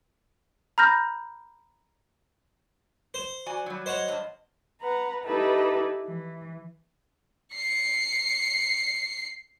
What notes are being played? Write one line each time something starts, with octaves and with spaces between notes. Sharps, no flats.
A#5 B5 F6 G6 A#6
C5
F#4 D5 G#5
F#3 G3
C5 C#5 D#5 F#5
G2
B4 F#5 A#5
D#4 E4 G4 A4 B4
E3
C7 C#7